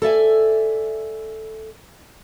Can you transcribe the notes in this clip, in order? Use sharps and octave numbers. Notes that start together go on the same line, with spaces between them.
A4 D5 E5 G#5